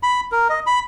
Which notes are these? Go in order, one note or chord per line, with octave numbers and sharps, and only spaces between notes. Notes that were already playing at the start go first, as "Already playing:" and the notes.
B5
A#4
D#5
B5